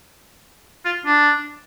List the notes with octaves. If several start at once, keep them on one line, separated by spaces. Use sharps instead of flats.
F4
D4